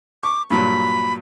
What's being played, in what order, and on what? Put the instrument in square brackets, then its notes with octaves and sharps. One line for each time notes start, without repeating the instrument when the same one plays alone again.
[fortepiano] C#6 [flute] D6
[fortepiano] G2 A#2 F#3 [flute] B5